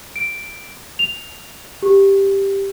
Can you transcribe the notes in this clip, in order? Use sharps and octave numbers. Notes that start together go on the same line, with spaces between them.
D7
F7
G4